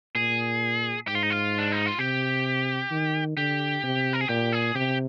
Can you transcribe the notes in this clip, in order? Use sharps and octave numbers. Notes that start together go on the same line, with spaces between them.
A#2 G#4
G#2 G4
F4
D#4
F4
D4
D#4
F4
C3 G4
D#3
D3 G4
C3
A#4
G#4
A#2 G4
G#4
C3 G4